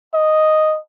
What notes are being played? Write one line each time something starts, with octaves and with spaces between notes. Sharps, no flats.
D#5